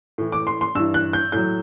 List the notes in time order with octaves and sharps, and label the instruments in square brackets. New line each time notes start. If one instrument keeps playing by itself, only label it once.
[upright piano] A2 E3
D6
C6
C6
G2 E3 E6
F#6
G6
A2 F#3 G6